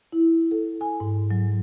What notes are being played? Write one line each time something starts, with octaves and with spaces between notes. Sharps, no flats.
E4
A4
G#5
G#2
F#3